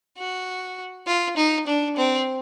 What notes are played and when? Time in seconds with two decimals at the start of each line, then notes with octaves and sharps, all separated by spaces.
0.17 F#4
1.07 F4
1.37 D#4
1.67 D4
1.97 C4